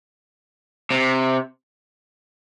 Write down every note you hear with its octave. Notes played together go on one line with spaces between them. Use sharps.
C3